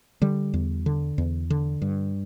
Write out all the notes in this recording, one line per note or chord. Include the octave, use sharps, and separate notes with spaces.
D3 G3
E2
D3
E2
D3
G2